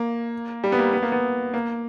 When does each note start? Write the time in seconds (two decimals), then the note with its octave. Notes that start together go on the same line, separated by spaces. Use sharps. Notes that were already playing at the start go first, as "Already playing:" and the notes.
Already playing: A#3
0.64 G3
0.72 B3
0.78 A#3
0.93 B3
1.03 A#3
1.12 B3
1.54 A#3